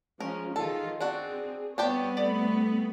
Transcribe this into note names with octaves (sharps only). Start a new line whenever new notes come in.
F3 G#3 C#4 A#4
D#3 F#3 F4 G#4 A4
C4 D4 F#4
G3 B3 C4 D4 G4 C#5 G5
A3 D5 B5